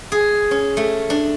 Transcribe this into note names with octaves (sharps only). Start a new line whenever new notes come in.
G#4
C#4
A3
D4